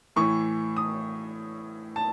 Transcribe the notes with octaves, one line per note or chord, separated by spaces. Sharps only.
A2 E3 C#6
D#6
A5